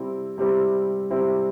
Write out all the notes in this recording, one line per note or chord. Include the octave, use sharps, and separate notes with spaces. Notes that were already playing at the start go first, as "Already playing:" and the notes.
Already playing: C3 G3 C4 E4
C3 G3 C4 E4
C3 G3 C4 E4